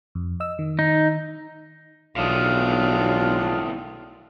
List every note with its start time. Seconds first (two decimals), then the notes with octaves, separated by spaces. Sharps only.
0.15 F2
0.40 D#5 E6
0.59 D#3
0.79 D#4
2.16 B1 E2 A2 D#3 D4 F4